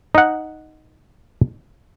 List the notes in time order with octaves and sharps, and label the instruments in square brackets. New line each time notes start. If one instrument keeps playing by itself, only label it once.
[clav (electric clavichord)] D#4 F#5